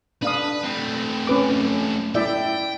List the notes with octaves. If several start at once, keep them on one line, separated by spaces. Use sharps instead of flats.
D4 B4 F5 D#6
A3 C4
C#4 B4 D6
E4 D5 E5 G5